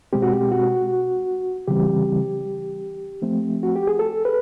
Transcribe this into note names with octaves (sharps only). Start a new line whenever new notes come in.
B2 G#3 C4 G4
F#4
G4
F#4
C#3 E3 G3 C4 G4
F3 A3 C4
F#4
G4
G#4
A4
B4